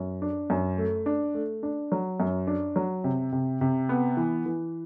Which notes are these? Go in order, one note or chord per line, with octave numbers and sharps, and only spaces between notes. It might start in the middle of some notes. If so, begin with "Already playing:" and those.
Already playing: F#2
D4
F#2
A3
D4
A3
D4
F#3
F#2
D4
F#3
C3
C3
C3
B3
E3
E3